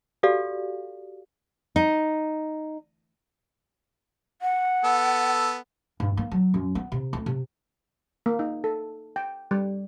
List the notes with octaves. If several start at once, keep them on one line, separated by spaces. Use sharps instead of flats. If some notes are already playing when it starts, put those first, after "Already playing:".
F#4 G4 A4 D5 F5
D#4
F#5
B3 A4
G2
A#3
F#3
F#2
B3
C3
D2
C3
A#3
D#4
A4
G5
G3